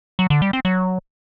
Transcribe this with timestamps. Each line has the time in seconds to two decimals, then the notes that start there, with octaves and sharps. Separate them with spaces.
0.19 F#3
0.30 D3
0.42 G3
0.53 C4
0.65 F#3